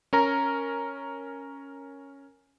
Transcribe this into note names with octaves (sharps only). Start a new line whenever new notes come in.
C#4 A#4 A#5